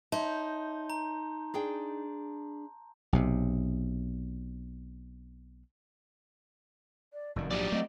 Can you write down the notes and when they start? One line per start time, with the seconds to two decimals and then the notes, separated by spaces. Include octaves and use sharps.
0.12 D#4 C#5 E5 A5 C6 G6
0.90 A#5
1.54 D4 G#4 G5
3.13 B1 C3
7.13 D5
7.36 F1 F#2 D#3 D5
7.51 A#1 G#2 F#3 G4 D5
7.72 A3 C4 D#5